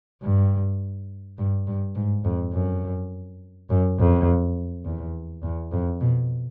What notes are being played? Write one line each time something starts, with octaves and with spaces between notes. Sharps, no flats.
G2
G2
G2
G#2
F2
F#2
F#2
F2
E2
E2
F2
B2